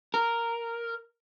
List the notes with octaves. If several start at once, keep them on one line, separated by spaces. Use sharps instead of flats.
A#4